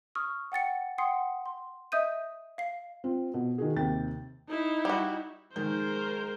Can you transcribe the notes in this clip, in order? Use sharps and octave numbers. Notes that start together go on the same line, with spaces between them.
C#6 D#6 F6
F#5 G5 A6 C#7
F#5 G5 C6 D#6 C7 C#7
C6
D#5 E5 D#6 G6 D#7
F5 C7
C4 F4
B2
D#3 F#4 G#4
D#2 C3 G5 A6
D#4 E4
G3 F#4
D#3 G#3 A#4 C5 G6